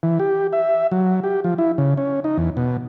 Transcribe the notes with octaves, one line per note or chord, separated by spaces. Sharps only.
E3
G4
E5
F#3
G4
F3
E4
C#3
C#4
D#4
E2
B2